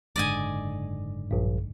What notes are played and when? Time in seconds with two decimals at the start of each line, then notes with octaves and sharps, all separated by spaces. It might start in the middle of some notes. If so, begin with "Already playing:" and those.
0.16 F#1 G#2 D3 D5 D#5 G#5
1.31 A#1 G2